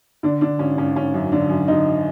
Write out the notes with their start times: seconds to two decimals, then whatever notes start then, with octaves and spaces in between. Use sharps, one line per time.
0.23 D3 D4
0.41 D3 D4
0.59 G#1 C#4
0.78 G#1 C#4
0.96 G#1 C#4
1.14 F#2
1.32 D3 D4
1.49 F#2
1.68 D3 D#4